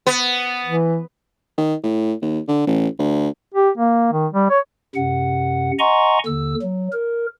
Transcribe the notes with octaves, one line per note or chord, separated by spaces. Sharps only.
B3
E3
D#3
A2
D#2
D3
A1
D2
G4
A#3
D#3
G3
C#5
F#2 C3 F#5
D#5 F#5 G#5 A#5 C6 C#6
D#2 D3 E6
F#3
A#4